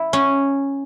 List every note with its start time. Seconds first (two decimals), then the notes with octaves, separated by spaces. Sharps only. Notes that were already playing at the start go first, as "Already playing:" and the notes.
Already playing: E4
0.13 C#4